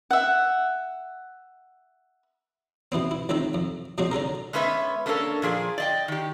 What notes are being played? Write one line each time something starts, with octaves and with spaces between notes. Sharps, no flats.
E5 F#5
B2 E3 B3 C4
E4
C#2 D#3 C4 A4 E5
F2
B2 F3 G#3 C4 C#4 F#4
D3 C#4 A4 A#4
G#3 B3 C#4 B4 E5
A3 A#3 C#4 D4 A4 A#4
A#2 F3 G#4 D5
D5 D#5 G5
D#3 G4